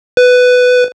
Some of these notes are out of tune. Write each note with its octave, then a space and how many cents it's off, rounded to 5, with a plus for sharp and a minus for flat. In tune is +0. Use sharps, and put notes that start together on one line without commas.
B4 +10